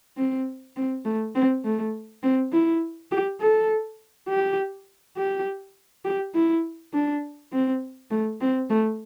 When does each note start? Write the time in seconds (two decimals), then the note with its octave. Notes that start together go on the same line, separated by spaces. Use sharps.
0.17 C4
0.76 C4
1.05 A3
1.35 C4
1.64 A3
2.23 C4
2.53 E4
3.11 G4
3.41 A4
4.29 G4
5.17 G4
6.05 G4
6.35 E4
6.93 D4
7.53 C4
8.11 A3
8.41 C4
8.70 A3